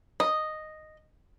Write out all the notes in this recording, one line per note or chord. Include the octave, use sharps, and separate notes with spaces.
D#5